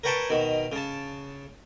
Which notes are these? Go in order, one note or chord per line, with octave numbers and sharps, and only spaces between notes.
A#4 B4 C#5 G5 A5
B2 D#3
C#3 A5